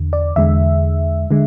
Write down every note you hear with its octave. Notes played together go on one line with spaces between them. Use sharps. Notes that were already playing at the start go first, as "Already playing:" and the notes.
Already playing: E2 D3
D5
E2 D3 G#3 E5
D3 G#3